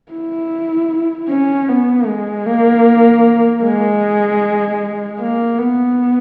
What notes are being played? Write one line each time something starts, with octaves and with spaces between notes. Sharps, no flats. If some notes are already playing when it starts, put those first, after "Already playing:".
E4
C#4
B3
G#3
A#3
G#3
A#3
B3